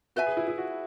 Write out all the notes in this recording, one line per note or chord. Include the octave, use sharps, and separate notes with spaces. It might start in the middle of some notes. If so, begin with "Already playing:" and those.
F#4 B4 E5 G#5
G#4
E4
E4
F#4